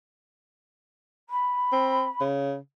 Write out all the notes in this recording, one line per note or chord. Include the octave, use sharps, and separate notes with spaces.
B5
C4
C#3